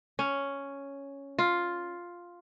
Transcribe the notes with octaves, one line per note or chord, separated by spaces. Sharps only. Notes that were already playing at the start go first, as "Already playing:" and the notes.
C#4
F4